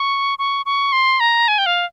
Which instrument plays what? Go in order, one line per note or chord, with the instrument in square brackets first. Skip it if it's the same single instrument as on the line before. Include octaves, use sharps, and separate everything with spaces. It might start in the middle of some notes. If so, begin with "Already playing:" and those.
Already playing: [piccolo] C#6
C#6
C#6
C6
A#5
G#5
G5
F5